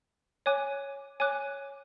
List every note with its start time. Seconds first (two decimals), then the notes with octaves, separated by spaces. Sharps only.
0.46 C#5 G#5 D6 F#6
1.20 C#5 G#5 D6 F#6